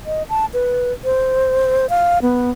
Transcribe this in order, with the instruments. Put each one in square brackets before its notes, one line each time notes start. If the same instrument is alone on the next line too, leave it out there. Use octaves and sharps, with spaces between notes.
[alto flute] D#5
A5
B4
C5
F5
B3